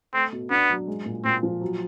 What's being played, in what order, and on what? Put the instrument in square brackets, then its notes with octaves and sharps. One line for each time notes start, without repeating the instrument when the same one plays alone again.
[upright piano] A3 [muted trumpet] C4
[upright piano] B2
[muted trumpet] B3 [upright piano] D4
[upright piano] F#3
G#3
A#2
[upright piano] A#2 [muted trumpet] C4
[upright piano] F3
F#3